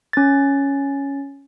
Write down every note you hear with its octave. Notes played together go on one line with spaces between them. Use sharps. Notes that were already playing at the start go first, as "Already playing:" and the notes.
C#4 A6